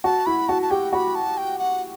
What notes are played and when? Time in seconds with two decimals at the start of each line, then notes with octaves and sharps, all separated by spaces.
0.04 F#4 A5
0.26 E4 B5
0.49 F#4 A5
0.62 A5
0.71 G4 G5
0.93 F#4 B5
1.15 A5
1.37 G5
1.59 F#5